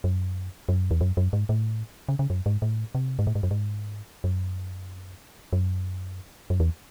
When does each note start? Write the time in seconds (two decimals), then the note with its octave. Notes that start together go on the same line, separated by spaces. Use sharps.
0.04 F#2
0.69 F#2
0.91 E2
1.01 F#2
1.17 F#2
1.33 G#2
1.49 A2
2.09 C#3
2.19 C#3
2.30 F#2
2.46 G#2
2.62 A2
2.95 C3
3.19 G#2
3.27 A2
3.35 G#2
3.43 F#2
3.51 G#2
4.24 F#2
5.53 F#2
6.50 F#2
6.60 E2